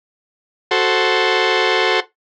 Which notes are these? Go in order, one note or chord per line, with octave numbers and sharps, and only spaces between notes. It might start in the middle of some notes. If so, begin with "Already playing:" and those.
F#4 A4 C5